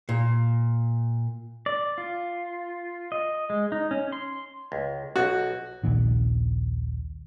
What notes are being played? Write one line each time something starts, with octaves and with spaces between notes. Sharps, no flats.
A#2
D5
F4
D#5
G#3
D#4
C#4
C6
C#2
B1 F#4
A#1 D#2 A#2 D#3